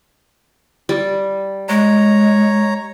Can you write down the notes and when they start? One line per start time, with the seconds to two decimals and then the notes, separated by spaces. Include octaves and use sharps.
0.89 G3
1.69 G#3 C#5 A#5